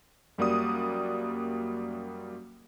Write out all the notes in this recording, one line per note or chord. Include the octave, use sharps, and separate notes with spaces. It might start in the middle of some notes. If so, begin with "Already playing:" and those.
F#2 G3 A#3 F#4 D5 D#6